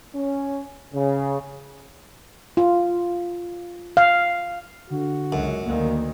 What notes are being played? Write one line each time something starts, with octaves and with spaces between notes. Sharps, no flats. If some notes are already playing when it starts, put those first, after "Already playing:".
C#4
C#3
F4
F5
D3 F#4
C#2 F#2
D2 D#3 A#3